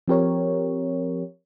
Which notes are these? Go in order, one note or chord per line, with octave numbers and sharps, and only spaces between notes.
F3 C4 G4 A#4 C#5